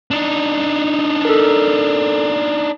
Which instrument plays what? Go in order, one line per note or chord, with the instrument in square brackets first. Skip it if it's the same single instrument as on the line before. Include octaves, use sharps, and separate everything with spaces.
[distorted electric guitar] D4 D#4
[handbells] A4 A#4